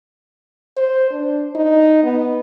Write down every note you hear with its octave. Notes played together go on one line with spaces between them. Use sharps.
C5
D4
D#4
B3